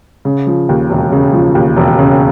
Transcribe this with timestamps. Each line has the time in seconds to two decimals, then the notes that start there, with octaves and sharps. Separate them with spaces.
0.25 C#3
0.47 F3
0.69 D#2
0.89 E1
1.12 C#3
1.33 F3
1.55 D#2
1.76 E1
1.99 C#3